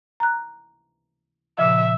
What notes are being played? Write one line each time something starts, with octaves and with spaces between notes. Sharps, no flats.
A#5 F#6
A#2 C#3 F3 E5